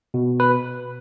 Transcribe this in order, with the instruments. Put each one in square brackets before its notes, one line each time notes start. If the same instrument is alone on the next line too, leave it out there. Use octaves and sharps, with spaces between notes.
[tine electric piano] B2
B4